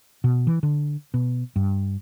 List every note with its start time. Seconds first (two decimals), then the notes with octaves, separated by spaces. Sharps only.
0.24 B2
0.47 E3
0.63 D3
1.14 B2
1.56 G2